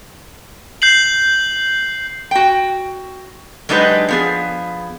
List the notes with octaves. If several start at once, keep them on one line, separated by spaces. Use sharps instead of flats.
G6 C7 F#7
F#4 G5
F#3 G#3 D4 D#4 G4 B4
F3 B3 G#4